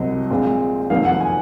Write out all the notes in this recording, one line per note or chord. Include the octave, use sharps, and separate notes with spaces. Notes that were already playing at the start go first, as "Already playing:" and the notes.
Already playing: C2 C3 F#3 C4 D#5
A#1 A#2 G#3 C4
F1 F2 D#3 F#3 A#3 F5
F#5
G#5